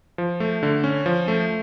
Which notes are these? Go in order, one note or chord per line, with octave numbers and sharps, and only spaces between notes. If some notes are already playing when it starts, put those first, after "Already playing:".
F3
A3
D3
C#4
F3
A3